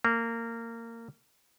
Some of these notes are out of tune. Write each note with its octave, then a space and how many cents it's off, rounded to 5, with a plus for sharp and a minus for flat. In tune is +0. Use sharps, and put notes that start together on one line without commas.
A#3 -20